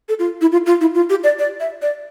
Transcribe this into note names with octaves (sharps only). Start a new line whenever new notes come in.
A4
F4
E4
F4
F4
E4
F4
G4
D5
D5
E5
D5